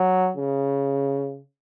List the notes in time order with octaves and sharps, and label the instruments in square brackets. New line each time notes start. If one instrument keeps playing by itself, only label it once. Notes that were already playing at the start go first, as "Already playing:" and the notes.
Already playing: [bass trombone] F#3
C#3